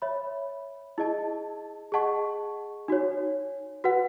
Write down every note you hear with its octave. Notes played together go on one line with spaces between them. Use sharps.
C#5 E5 B5
E4 G#4 D#5 A5
G#4 D#5 F#5 A5 C#6
D#4 F#4 C#5
F#4 B4 F#5